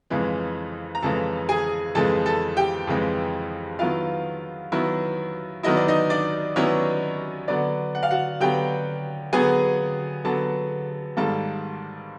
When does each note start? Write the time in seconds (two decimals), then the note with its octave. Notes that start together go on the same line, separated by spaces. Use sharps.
0.10 F2 C#3 E3 G#3
0.95 A#5
1.03 F2 C#3 E3 G#3 A4 A5
1.49 G#4 G#5
1.95 F2 C#3 E3 G#3 A4 A5
2.26 A4 A5
2.57 G4 G5
2.87 F2 C#3 E3 G#3
3.79 D#3 F#3 B3 E4 F4 F5
4.72 D#3 F#3 B3 E4
5.63 D#3 F#3 B3 E4 D#5
5.77 D5
5.88 D#4 D#5
6.10 D4 D5
6.56 D#3 F#3 B3 C#4 E4 C#5
7.48 D3 F#3 B3 D4 D5
7.95 F#5
8.03 F5
8.11 F#4 F#5
8.40 D3 F#3 B3 G4 G5
9.33 D3 F#3 B3 G#4 G#5
10.25 D3 F#3 B3 A4 A5
11.17 G#2 D#3 G3 A#3 A4 A5